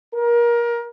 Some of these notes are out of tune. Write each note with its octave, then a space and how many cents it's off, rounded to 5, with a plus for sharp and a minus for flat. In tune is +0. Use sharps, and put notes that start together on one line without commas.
A#4 +25